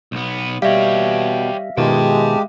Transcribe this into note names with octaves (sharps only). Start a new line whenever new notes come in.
B1 B3
B2 G3 G4 C#5 E5 F5
B2 D#3 G#3 F4 G4 G5 A5